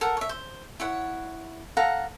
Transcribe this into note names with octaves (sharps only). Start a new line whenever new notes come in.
A4 A#4 F#5
C#5 E5
C5
E4 C#5 F#5
A4 F5 F#5 A#5